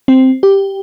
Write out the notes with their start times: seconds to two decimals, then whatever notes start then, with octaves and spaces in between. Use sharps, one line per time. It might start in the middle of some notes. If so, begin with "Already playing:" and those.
0.08 C4
0.43 G4